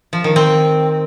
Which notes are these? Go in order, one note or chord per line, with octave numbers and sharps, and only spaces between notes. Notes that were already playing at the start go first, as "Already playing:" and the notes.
F3
D#3
C4